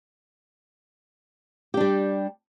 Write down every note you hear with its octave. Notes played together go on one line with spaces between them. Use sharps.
G3 D4 G4